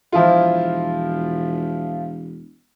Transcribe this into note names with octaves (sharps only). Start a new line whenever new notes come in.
E1 F3 E4 F4